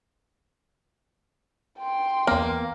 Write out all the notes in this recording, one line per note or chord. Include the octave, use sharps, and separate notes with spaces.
G5 C6
E2 A#3 B3 F6